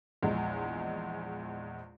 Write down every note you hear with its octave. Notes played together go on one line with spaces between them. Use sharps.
A#1 E2 G#3